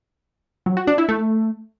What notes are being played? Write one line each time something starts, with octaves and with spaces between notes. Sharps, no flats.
F#3
F#4
D4
E4
A3